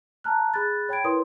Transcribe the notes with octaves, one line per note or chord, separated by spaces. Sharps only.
A5 A#5 F6 F#6
G#4 B5 F#6 A6
C#5 G5 B5 G#6 D7
E4 A#4 B4 C#5 C6 D#6